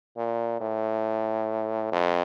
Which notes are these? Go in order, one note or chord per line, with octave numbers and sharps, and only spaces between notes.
A#2
A2
F2